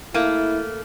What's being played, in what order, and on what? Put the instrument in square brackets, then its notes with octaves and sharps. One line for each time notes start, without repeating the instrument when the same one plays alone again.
[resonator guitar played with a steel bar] A3 A#3 [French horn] E4